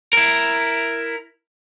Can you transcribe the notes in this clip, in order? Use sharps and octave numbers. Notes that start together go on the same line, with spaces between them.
E4 A#4